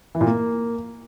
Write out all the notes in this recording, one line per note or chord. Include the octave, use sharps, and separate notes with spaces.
E3
A#2
A#3